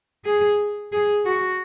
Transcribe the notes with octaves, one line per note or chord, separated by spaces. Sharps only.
G#4
G#4
F#4